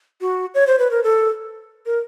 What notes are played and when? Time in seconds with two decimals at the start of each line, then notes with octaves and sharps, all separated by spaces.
0.21 F#4
0.54 C#5
0.67 C5
0.79 B4
0.91 A#4
1.04 A4
1.86 A#4